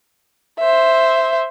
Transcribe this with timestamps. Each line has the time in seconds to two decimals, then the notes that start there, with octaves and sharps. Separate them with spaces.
0.59 C5 E5